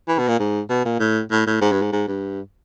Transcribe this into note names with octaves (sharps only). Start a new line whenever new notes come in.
E3
B2
A#2
G#2
B2
A#2
A2
A2
A2
G#2
G2
G#2
G#2
G2